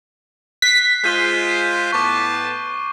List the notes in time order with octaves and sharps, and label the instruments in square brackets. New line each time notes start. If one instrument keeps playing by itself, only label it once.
[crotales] F#6 C7 [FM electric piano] B6
[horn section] G#3 F4 C5 [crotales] G6 D#7 G7
[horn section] A2 B3 A5 [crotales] C#6 D6